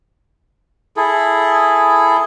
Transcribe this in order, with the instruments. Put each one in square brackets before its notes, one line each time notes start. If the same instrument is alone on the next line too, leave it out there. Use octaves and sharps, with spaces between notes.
[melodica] E4 G#4 A4